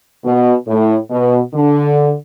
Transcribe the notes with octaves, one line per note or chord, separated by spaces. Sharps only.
B2
A2
B2
D3